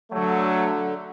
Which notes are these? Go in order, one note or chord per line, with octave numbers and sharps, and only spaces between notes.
D3 F#3 A3